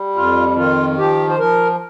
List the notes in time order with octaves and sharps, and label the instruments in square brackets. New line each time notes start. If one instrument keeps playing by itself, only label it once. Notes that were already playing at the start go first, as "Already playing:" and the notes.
Already playing: [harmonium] G3
F2 F4
D#3 F4
F3 G4
C5
F3 A#4